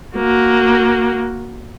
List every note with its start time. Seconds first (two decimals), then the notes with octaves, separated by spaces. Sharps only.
0.16 A#3 F#4